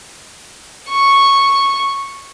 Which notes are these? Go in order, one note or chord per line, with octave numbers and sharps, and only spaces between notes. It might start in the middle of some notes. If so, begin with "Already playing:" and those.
C#6